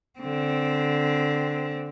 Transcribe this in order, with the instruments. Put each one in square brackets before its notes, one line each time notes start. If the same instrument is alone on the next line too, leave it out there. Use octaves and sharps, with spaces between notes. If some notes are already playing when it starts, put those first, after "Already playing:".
[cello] D3 C4